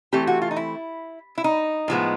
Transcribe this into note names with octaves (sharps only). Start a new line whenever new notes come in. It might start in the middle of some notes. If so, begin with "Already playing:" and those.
E3 A3 C4 G4
F#4
F4
D#4
E4
E4
D#4
A2 F3 G#3 B3